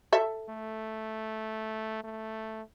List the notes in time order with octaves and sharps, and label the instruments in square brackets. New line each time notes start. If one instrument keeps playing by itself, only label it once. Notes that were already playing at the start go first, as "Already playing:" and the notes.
[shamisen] A4 E5
[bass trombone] A3
A3